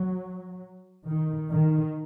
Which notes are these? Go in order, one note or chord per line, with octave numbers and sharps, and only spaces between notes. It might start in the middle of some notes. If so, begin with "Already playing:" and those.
Already playing: F#3
D#3
D#3